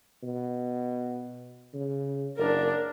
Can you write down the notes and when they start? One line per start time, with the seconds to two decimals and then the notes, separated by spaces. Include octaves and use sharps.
0.23 B2
1.73 C#3
2.37 F#1 D4 A#4